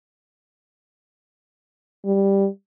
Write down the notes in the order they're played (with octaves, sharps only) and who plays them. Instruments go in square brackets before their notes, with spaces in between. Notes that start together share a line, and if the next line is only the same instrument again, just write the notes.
[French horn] G3